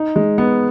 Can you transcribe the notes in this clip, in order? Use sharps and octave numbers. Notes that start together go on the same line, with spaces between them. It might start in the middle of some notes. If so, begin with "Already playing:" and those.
Already playing: D#4
G#3
B3